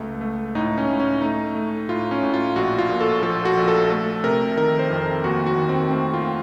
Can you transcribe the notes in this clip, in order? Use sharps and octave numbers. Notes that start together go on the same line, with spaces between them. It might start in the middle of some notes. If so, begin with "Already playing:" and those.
Already playing: C#2 A3
A3
A2 D#4
C#4
A2
C#4
A3 D#4
A3
A2 F4
C#4
A2
F4
A#1 F#4
F4
A#2
A4
F3 A4
F#4
A#1
A4
A3 A4
C3 A#4
D#3 A#4
C5
F2
D#2 F#4
F#4
D#3
C4
A3 C4
F4